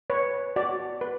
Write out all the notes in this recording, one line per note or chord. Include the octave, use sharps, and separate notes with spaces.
B4 C#5
F#4 D5
B4